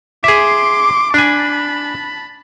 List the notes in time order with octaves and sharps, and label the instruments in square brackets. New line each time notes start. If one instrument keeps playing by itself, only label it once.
[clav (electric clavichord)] G#4 E5 [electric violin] C6 D6
[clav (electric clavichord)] D4 G#5 [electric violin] A5 B5